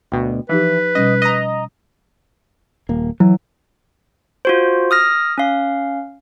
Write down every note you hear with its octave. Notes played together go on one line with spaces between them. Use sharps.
D2 B2 G5
E3 F3 D#4 G4 B4
B2 G3 C#4 D#5
D#5 A#5
D#1 A#3
E3 F#3
F4 F#4 C5
D#6 F6 A#6
C#4 F5